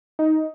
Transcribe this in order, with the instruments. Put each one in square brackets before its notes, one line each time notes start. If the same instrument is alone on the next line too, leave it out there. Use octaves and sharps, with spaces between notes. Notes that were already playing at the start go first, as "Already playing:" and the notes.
[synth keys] D#4